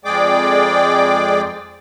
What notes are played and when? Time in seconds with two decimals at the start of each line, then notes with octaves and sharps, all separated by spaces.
0.05 F2 G#3 G#4 D5 G5 D6